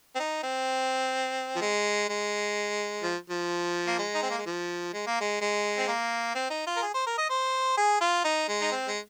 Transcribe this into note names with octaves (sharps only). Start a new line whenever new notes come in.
C4
D#4
C4
F3
G#3
G#3
F3
F3
A#3
G#3
D#4
C4
A#3
G#3
F3
G#3
A#3
G#3
G#3
C4
A#3
C4
D#4
F4
A#4
G#4
C5
A#4
D#5
C5
G#4
F4
D#4
G#3
D#4
C4
G#3